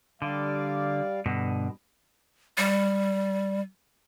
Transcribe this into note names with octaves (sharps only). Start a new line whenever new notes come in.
D3 G3 D5 F5
G2 B2 D3
G3